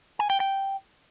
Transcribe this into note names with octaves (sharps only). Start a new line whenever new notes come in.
G#5
G5
G5